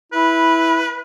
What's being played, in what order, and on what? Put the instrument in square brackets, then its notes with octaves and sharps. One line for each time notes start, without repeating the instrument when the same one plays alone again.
[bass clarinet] E4 [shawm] B4